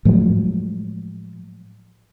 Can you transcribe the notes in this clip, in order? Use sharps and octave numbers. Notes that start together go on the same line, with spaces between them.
A2 F3 F#3 G#3